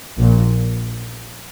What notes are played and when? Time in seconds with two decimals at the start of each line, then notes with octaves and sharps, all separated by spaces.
0.17 A#1 A#2